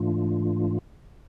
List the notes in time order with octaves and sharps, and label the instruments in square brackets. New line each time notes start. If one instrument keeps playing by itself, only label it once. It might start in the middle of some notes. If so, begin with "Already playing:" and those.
Already playing: [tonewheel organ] G#2 E3 A3 D4 F4